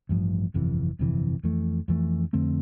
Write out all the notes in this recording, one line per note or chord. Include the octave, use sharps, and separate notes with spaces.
A1 G2 F3
G1 F2 C3 E3
G1 F2 C3 E3
F2 E3 A3
F2 E3 A3
F2 D3 A3 C4